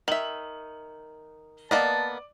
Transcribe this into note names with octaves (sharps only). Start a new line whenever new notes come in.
D#3 E5 F#7
A#3 B3 D5 D#5 A5